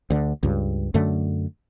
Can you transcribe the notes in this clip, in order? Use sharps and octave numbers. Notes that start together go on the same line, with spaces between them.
D2 D3
C#2 G2
F#2 D3 A3